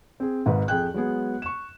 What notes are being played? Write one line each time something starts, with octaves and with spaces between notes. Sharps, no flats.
C4 G#4
G#1 G#2 B4
F2 G#4 G5 F#6
F#3 G#3 B3 G#4
C#6 E7